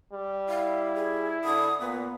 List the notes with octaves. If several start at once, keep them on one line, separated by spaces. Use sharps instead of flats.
G3
E4 F5
G#4
D3 D#6
A#2 B3 B4